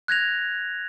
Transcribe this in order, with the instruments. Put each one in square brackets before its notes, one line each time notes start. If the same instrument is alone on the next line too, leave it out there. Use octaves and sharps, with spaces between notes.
[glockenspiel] F#6 G#6 A#6 F7